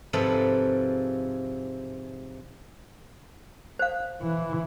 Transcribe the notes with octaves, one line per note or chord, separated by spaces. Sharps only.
G#2 C3 F3 A4 B4 B5
C5 F5
E3